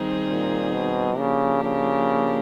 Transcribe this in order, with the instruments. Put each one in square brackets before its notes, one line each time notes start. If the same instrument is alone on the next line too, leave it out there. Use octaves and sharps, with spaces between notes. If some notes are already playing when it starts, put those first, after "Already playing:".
Already playing: [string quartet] D#3 G3 C4 D#4 G#4
[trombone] A#2
B2
[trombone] C#3 [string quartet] F3 A#3 D4 G4 A#4
[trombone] C#3